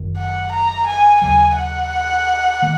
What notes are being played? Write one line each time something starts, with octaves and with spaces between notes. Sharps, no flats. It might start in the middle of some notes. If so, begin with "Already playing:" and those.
Already playing: F#1 F#2 D#3
F#5
A#5
G#5
D#2 C#3 F#3 G#5
F#5
D#3 A#3